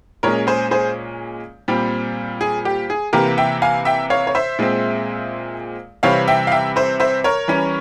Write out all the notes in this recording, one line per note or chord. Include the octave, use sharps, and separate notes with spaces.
A#2 G#3 C#4 A#4 C#5
G#4 C5
G#4 C5
A#2 G3 C4
G#4
G4
G#4
C3 E3 A#3 G4 A#4
E5 G5
F5 G#5
E5 G5
C#5 F5
C#5
C5 E5
A#2 G#3 C4
C3 E3 G3 C4 C#5 F5
E5 G5
F5
E5 G5
C5 E5
C5 E5
A#4 C#5
E3 G3 C#4